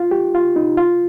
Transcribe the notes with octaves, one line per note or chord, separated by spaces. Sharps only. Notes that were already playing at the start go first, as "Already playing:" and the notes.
Already playing: F4
G4
F4
D#4
F4